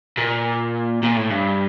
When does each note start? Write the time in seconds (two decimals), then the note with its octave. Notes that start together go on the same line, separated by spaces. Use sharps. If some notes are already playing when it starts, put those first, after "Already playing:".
0.17 A#2
1.03 A#2
1.16 A2
1.30 G2